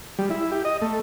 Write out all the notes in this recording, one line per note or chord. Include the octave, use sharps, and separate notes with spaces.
G3
E4
G4
D#5
A3